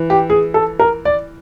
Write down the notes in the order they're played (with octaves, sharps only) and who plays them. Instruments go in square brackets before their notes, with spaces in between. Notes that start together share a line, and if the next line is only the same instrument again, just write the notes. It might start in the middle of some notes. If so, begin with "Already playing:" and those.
Already playing: [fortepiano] E3
[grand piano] G4
G#4
A4
A#4
D5